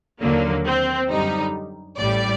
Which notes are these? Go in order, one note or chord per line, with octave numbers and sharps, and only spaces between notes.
D#2 D3 F#3 A#3
C4
F#2 D3 G3 D#4
A1 A2 G3 D5